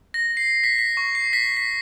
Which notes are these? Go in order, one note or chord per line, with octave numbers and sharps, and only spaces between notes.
A#6
C7
B6
B6
C#6
C7
B6
B6